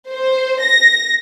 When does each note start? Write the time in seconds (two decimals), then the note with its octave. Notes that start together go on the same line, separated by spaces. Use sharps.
0.12 C5
0.61 A#6